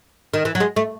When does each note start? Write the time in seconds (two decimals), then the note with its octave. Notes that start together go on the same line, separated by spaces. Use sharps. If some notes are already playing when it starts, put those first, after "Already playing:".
0.34 D#3
0.45 E3
0.55 F#3
0.60 G#3
0.76 A3